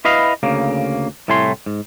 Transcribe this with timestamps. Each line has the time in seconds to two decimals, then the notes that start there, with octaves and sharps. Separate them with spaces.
0.05 E4 B4 D#5 F5
0.43 D2 C#3 A#3
1.28 C2 A2 A3 G#5 C6
1.66 G#2